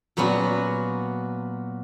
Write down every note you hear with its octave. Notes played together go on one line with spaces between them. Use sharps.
A#2 F#3 B3 C#4 F#4